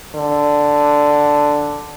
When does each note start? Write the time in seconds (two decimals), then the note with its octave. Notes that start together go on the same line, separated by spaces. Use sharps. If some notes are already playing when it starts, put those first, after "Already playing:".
0.15 D3